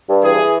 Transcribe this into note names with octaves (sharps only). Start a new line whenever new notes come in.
G2
E3 G#4
E3